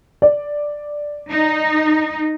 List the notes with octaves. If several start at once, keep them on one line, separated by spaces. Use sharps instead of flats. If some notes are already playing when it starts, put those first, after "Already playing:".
D5
D#4